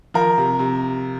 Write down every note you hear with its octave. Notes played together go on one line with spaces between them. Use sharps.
F3 A#4
C3
C3